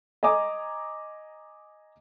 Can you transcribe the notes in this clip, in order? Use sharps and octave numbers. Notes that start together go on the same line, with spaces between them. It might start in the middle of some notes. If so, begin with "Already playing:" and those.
D#5 G#5 A#5 D6 D#6